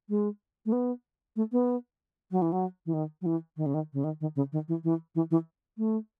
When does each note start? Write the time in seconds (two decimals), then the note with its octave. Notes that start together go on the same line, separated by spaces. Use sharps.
0.09 G#3
0.66 A3
0.72 B3
1.36 A3
1.52 B3
2.31 F#3
2.42 E3
2.52 F#3
2.86 E3
2.93 D#3
3.21 F#3
3.26 E3
3.57 D#3
3.66 C#3
3.74 D#3
3.93 C#3
4.04 D#3
4.21 D#3
4.36 C#3
4.52 D#3
4.68 E3
4.84 E3
5.15 E3
5.31 E3
5.78 A3